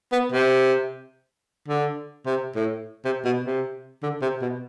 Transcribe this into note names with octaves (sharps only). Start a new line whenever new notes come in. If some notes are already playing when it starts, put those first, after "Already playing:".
B3
C3
D3
C3
A2
C3
B2
C3
D3
C3
B2